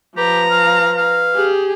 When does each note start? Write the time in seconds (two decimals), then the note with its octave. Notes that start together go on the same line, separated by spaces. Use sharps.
0.17 F3 G4 B4 A#5
0.51 F5
0.97 F5
1.34 G4 G#4